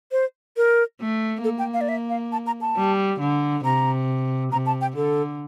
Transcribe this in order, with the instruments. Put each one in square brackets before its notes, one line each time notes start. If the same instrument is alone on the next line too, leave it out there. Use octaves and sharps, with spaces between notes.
[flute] C5
A#4
[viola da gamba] A3
[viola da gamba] A#3 [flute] A4
[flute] G5
F5
D5
E5
F5
A5
A#5
A5
[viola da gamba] G3
D3
[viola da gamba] C3 [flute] A#5
[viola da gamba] C3 [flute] A#5
[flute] A5
G5
[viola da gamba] D3 [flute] A4